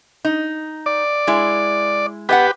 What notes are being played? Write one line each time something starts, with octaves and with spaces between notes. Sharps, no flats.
D#4
D5
G#3 E4
B3 G4 B4 D#5 F#5